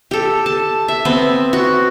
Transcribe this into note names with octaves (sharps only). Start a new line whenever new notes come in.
G4 A4
A5
E5
B3 C4
F#4